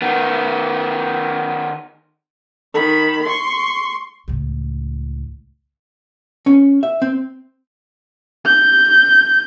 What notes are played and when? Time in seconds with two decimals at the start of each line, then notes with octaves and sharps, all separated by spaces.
0.02 D#3 B3
2.74 D#3 B5
3.25 C6 C#6
4.28 C#2 A2
6.46 C#4
6.83 E5
7.02 C4
8.45 G6